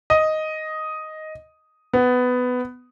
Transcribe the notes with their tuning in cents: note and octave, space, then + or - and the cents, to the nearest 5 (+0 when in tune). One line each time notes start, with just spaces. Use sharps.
D#5 +5
B3 +15